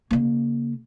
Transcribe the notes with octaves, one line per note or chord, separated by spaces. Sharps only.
C#3 A#3